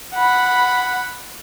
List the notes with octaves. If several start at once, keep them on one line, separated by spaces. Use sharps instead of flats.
F#5 B5